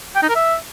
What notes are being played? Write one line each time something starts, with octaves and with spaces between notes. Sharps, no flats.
G5
D#4
A#4
E5